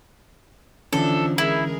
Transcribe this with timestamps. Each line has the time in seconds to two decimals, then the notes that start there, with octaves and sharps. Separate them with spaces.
0.93 D3 E3 F3 C#4 D4 E4 A4
1.38 G#3 E4 G#4 A#4